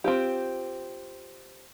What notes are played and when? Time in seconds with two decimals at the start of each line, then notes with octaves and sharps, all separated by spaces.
0.04 C4 F4 G4